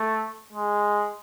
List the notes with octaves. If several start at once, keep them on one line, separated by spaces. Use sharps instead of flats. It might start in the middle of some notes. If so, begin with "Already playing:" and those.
Already playing: A3
G#3